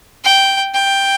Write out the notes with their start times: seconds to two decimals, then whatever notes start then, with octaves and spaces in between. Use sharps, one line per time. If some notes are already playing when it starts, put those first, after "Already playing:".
0.24 G5
0.74 G5